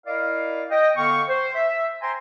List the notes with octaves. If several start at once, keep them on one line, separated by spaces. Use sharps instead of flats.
E4 A#4 D5 D#5 F5
D#5 G5
D3 B3 F5 G5 C#6
C5
E5
C5 E5 G5 G#5 A#5 C6